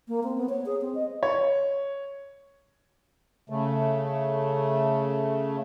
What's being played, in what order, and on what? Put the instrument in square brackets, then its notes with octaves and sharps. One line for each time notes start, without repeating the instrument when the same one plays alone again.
[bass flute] A#3
C4
B3
C#5
G#4
C4
D#5
[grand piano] C#5
[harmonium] C#3 A3